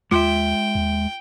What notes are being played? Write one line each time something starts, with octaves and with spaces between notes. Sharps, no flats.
D#2 G#3 F4 E5 G5 C6
D#2